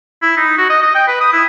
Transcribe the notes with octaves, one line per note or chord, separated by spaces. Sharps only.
E4
D#4
F#4
D#5
D#5
G5
B4
D#6
E4